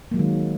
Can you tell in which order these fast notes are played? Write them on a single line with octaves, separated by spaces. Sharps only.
A#3 F#3 G#3 D#3